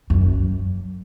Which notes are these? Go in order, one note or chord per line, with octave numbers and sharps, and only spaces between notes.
F#2